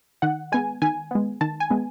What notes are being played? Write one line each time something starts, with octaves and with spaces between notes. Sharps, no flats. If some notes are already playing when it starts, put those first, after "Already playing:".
D#3 F#5
G#3 B3 G#5
D#3 G#5
G#3 B3
D#3 A5
G#5
G#3 B3